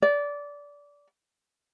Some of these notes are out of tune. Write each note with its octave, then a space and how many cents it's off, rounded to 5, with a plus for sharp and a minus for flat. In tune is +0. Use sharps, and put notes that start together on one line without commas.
D5 -20